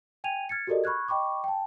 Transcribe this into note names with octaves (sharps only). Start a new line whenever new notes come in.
G5 G#5 G#6 D#7 F7
F6 G#6 A6 C#7
F#4 G4 A4 A#4 D5 D#5
B5 C#6 F6 F#6 G#6
D#5 G5 B5 C#6 D6
G5 A5